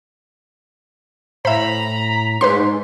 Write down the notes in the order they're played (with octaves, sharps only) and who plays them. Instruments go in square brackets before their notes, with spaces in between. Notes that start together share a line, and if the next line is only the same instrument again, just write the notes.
[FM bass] A2 [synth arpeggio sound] C5 E5 [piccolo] A#5 [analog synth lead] B5
[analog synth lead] G#2 [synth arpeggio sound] B4 C5 C6